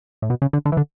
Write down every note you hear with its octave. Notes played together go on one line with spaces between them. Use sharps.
A2
B2
C#3
D3
D3
E3
D3